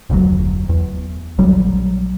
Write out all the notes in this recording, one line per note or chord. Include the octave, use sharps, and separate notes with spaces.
F1 D2 C3 F#3
E2
A#1 F#3 G3